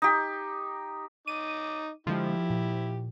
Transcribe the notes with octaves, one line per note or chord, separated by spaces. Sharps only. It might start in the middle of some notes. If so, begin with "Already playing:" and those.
D#4 G4
D#4 D6 D#7
D3 F3 G#3 E4 G4
A#2